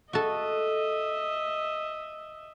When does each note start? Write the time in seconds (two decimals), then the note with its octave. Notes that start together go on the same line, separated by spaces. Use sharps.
0.13 F#4 A4 D#5 E5